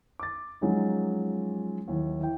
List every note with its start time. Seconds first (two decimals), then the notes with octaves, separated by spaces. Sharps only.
0.19 D6 A6
0.61 F3 F#3 G#3 C#4 D#4
1.88 D#2 E3 F#3
2.20 E3 G5